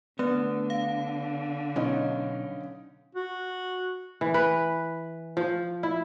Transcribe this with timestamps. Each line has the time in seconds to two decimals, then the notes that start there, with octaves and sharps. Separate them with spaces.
0.19 D3 A3 B3
0.70 F5
1.76 B1 C#4 D#4
3.15 F#4
4.21 E3
4.34 B4
5.37 F3
5.83 E4